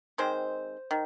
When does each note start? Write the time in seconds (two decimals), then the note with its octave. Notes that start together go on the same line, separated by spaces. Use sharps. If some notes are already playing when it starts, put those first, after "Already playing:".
0.18 D#3 G#3 C4 C5
0.91 D#3